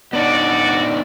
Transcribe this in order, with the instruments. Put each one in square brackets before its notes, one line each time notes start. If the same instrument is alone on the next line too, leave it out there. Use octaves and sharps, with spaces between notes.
[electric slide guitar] B3 D4 D#4 [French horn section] F#4 D5